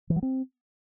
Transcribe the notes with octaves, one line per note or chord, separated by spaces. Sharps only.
E3
F#3
C4